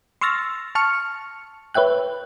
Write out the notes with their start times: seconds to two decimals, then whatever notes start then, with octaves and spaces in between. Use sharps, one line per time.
0.21 C6 C#6 E6 F6 A6 A#6
0.75 A5 C#6 F6 C#7
1.74 B4 C#5 E5 G5 F#6